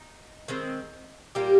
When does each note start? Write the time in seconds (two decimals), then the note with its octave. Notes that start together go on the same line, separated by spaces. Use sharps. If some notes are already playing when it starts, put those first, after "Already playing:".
Already playing: D#4
0.48 D#3 G#3 C4
1.35 A#2 G3 A#3 G4